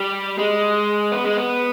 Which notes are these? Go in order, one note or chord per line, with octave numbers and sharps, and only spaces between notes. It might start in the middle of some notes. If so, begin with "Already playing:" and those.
Already playing: G3
G#3
B3
G#3
B3